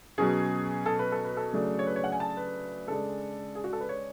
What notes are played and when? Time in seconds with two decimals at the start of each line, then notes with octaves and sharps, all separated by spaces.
0.18 B2 F#3 C#4 G#4
0.86 A4
0.99 B4
1.12 A4
1.24 B4
1.37 A4
1.53 C#3 F#3 A3 D4
1.79 C#5
1.87 B4
1.96 C#5
2.04 F#5
2.12 G#5
2.20 A5
2.37 B4
2.88 C#3 G#3 D4 A4
3.55 G#4
3.64 F#4
3.73 A4
3.80 B4
3.89 C#5